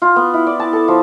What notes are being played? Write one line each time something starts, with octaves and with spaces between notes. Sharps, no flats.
F4
B3
E4
D5
A5
A4
F3